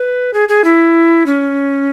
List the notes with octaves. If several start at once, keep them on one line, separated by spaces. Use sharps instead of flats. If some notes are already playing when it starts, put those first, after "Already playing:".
Already playing: B4
G#4
G#4
E4
C#4